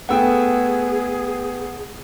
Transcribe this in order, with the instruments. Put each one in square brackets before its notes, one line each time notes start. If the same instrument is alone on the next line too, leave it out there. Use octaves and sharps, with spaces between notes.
[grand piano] A3 B3 G5 [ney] G#4 [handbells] F#5 E6